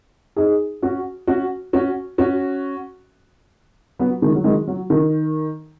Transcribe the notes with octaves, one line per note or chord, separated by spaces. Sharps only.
D#4 G#4
C#4 F#4
C#4 F#4
C#4 F#4
C#4 F#4
F#3 B3
D#3 G#3
F#3
D#3 G#3
F#3
D#3